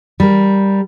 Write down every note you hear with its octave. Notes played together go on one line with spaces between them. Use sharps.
G3 A#4